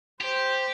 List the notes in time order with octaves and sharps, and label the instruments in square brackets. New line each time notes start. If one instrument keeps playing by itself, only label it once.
[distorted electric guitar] G4 [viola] C5